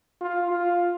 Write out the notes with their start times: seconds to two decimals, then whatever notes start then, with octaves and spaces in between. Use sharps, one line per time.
0.21 F4
0.51 F4